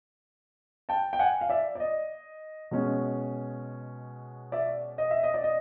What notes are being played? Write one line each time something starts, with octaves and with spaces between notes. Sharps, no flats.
G5 A5
G5
F#5 G#5
F5
D5 E5
D5
D#5
B2 G#3 C#4
D5 E5
D#5
E5
D#5
D5
D#5